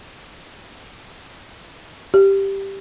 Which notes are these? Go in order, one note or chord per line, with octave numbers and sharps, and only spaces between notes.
G4